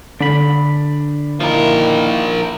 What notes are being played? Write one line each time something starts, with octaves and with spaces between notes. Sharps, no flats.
D3 D4 B5
D#3 F3 A#3 E4 A#4